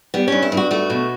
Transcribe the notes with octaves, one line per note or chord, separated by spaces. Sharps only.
G3 B3
G2 C#4
E4
G2
F#4
A3 F#4
B2